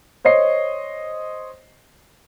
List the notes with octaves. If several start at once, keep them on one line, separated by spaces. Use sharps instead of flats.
C5 C#5 D#5 C7